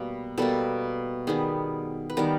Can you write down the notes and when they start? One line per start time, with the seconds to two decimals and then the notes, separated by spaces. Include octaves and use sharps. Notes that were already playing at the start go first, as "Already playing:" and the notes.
Already playing: B2 G3 A#3
0.38 B2 G3 A#3 A4
1.27 D#3 G3 B3 G#4
2.10 B4
2.17 D#3 G3 B3 A#4